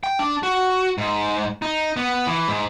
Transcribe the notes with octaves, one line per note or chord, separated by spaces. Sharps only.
G5
D4
F#4
G#2
D#4
B3
E3
G#2